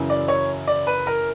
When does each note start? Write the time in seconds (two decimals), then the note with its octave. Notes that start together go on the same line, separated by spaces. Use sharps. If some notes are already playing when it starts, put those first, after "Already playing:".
Already playing: F#2 C#3 E3
0.10 D5
0.28 C#5
0.68 D5
0.87 B4
1.07 A#4